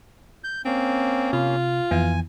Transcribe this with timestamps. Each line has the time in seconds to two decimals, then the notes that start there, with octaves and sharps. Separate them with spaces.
0.44 G6
0.65 A#3 C4 C#4
1.33 C3 F4
1.91 F2 E3 B3 G#5